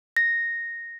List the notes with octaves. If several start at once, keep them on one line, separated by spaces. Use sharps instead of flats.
A#6